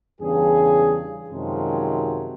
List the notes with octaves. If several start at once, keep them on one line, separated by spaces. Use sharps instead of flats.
E2 G2 C#3 G#4
F#2 C3 D#3 F3 F#3 G#3